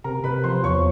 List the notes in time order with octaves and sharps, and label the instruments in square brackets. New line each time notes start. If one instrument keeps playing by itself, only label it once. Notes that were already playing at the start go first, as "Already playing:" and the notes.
[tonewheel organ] C3 [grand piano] A#4 A#5
[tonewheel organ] C3 [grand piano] B4 B5
[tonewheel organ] F3 [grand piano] C5 C6
[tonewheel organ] E2 [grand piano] C#5 C#6